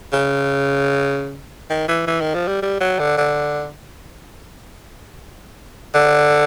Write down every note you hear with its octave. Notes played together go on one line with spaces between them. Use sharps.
C#3
D#3
E3
E3
D#3
F3
G3
G3
F#3
D3
D3
D3